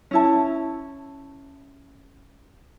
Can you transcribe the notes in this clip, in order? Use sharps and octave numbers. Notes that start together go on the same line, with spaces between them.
C#4 E4 A5